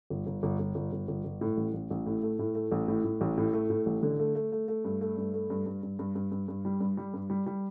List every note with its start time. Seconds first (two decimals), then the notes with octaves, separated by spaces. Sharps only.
0.10 G1
0.26 G1
0.43 G1
0.59 G1
0.75 G1
0.93 G1
1.08 G1
1.24 G1
1.41 A2
1.57 A1
1.74 A1
1.90 A1
2.06 A2
2.23 A3
2.39 A2
2.55 A3
2.71 A1
2.88 A2
3.05 A2
3.21 A1
3.38 A2
3.53 A3
3.70 A2
3.86 A1
4.03 D3
4.19 A3
4.35 A3
4.52 A3
4.68 A3
4.85 G2
5.01 A3
5.17 G2
5.34 A3
5.50 G2
5.66 G2
5.83 G2
5.99 G2
6.15 G2
6.32 G2
6.48 G2
6.65 G3
6.80 G2
6.97 G3
7.14 G2
7.30 G3
7.46 G3